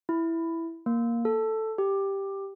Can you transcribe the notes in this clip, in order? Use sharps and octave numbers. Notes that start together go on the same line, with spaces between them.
E4
A#3
A4
G4